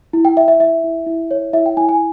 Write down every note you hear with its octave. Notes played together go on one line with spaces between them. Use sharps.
E4
G5
E4 E5
E5
E4 E5
E4
E4
C#5
E4 E5
G5
E4 G#5
G#5